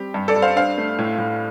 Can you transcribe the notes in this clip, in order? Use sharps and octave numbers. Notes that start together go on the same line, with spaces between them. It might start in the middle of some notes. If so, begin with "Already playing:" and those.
Already playing: G3 C4 G4
G2
A4 D5
G2
C5 F5
D4 C5 F5
A3
A2
A2